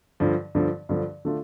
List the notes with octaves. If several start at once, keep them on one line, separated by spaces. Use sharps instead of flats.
G2 D3 F3
G2 D3 F3
G2 D3 F3
D3 A3 D4 F4